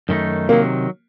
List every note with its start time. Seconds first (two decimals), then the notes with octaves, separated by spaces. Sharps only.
0.09 F#2 D#3 A3 D#4
0.49 C3 D#3 F#3 A#3